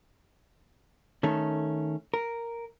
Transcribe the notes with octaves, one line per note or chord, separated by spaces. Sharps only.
D#3 A3 C#4 A4
A#4